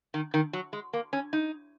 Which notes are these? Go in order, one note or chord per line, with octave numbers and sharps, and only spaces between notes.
D#3
D#3
F#3
G#3
A#3
C#4
D#4